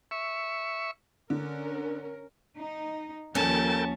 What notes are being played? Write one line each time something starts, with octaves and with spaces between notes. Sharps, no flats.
E5 C#6
D3 C#4 A#4
D#4
D#2 F3 C#4 A4 A#4 G5 A5